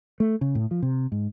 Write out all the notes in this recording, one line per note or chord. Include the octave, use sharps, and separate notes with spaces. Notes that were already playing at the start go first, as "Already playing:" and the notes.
A3
C#3
A2
F3
C3
G#2